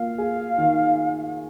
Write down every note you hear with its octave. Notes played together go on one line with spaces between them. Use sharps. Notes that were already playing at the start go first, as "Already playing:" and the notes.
Already playing: A#3 F4 F5
G#4
D#3